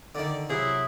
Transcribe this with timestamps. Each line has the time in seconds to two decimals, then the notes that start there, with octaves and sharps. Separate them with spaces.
0.15 D3 D#3 A4 D5
0.50 C3 F#3 E4 G#4 C5 D#6